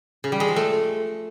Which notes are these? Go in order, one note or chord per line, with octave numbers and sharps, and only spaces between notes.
C#3
G3
G#3
F3
A3